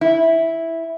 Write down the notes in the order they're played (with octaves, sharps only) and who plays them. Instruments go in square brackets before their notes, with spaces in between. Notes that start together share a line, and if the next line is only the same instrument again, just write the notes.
[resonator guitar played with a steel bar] E4